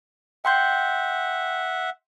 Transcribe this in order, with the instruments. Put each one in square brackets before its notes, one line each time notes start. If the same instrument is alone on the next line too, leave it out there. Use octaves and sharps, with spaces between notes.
[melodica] E5 F#5 [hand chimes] G5 C6 G6